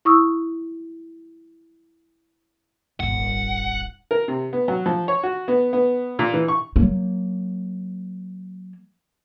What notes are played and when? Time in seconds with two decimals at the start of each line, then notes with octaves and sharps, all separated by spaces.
0.05 E4 C#6 D#6 E6
3.00 D#1 G#1 F#5
4.11 A#4
4.28 C3
4.53 B3
4.68 F#3
4.86 F3
5.08 C#5
5.23 F#4
5.48 B3
5.73 B3
6.19 A#2
6.34 E3
6.48 C#6
6.76 F#3 A#3